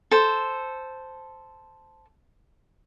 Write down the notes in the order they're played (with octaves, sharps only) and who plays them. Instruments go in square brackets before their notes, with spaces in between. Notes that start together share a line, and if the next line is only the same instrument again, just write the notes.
[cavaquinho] A4 C5